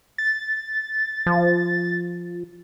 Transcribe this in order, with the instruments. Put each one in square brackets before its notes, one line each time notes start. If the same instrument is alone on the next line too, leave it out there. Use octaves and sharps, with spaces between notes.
[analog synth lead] A6
[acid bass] F3